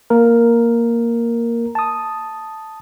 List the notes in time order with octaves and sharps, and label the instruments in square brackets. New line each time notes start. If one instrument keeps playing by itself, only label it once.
[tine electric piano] A#3 A#4
A5 D#6